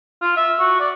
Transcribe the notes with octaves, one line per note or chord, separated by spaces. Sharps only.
F4
E5
F#4
D5